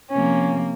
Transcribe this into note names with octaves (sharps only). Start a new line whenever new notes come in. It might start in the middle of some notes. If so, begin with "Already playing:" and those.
C3 F3 A#3 C#4